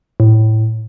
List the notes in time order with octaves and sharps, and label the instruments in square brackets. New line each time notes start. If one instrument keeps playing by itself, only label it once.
[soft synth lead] A2